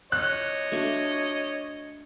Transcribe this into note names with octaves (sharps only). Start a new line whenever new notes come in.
C#5 D#5 F#6
A3 D4 F#4